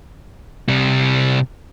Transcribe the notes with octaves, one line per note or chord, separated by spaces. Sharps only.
C3 G3